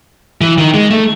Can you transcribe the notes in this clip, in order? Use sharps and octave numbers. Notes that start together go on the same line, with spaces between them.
E3
D#3
G#3
A3